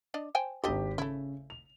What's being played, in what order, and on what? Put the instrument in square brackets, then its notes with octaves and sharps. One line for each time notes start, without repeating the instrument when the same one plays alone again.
[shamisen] D4 D5 D#5
C5 G5 G#5
[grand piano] G#1 G4 [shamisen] D3 D4 D#5
[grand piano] C#3 [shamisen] A3 E4
[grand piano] F7